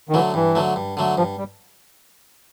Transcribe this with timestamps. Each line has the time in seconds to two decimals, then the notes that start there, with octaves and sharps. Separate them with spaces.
0.09 D#3
0.14 D3 E3 F#3 A3
0.34 G2 E3
0.55 D3 F#3 A3
0.76 G2
0.97 D3 F#3 A3
1.17 G2 F3
1.38 G3